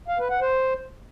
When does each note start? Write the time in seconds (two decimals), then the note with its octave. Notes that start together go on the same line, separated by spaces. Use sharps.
0.08 F5
0.19 B4
0.30 F#5
0.41 C5